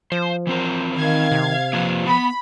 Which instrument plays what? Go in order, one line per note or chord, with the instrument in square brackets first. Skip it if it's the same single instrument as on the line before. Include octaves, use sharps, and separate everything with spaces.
[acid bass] F3 [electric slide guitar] C5
[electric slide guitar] E3 C4 A#4 [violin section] C5
[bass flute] D#3 [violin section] F5 G#6
[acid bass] C3
[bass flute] F3 [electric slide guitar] A#3 F4 B4
[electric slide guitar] B3 [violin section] B5